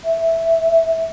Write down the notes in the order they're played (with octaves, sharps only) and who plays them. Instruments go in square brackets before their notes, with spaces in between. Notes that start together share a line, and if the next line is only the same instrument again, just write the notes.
[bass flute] E5